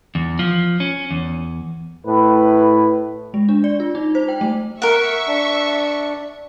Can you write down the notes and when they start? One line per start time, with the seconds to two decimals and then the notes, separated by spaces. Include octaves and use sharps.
0.15 E2
0.39 F3
0.80 C#4
1.11 E2
2.07 A2 B4
3.34 G#3
3.49 D4
3.64 D5
3.80 F4
3.95 D#4
4.15 C5
4.28 G5
4.41 A3
4.82 A#4 E5 F#5 C#6
5.28 D4